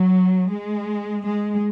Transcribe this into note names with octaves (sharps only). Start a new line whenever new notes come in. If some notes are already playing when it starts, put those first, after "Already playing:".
Already playing: F#3
G#3
G#3